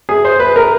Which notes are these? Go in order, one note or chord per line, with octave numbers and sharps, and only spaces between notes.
G#4
C5
B4
A#4